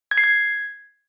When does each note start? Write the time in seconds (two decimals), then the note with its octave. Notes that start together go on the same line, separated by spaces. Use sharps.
0.11 G#6
0.18 C7
0.24 G#6